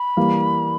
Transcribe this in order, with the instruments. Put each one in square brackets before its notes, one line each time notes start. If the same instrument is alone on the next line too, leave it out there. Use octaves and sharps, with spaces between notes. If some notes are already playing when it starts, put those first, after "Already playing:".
Already playing: [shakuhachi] B5
[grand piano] E3 G3 A#3